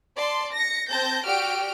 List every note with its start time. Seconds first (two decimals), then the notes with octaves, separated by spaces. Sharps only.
0.17 D5 A5 C6
0.53 A#6 C#7
0.89 C4 A5 G6 A#6
1.25 F#4 G4 D5 G5 F6 D7